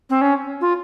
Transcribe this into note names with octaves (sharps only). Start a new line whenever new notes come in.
C4
C#4
F4